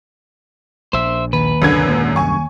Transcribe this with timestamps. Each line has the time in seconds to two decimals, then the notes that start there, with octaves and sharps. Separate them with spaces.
0.93 A#1 C5 E5
1.33 D#2 B4
1.62 C2 F#2 D3 A#3 G#6
1.87 A#2 G#3
2.16 C2 F#2 G#5 C#6